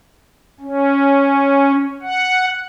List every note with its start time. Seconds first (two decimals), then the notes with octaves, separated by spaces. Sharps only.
0.61 C#4
2.02 F#5